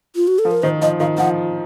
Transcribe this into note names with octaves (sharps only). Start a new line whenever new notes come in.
F4
F#4
A4
F3
A#4
D#3 C5
F3 D#5
D#3 F5
F3 F#5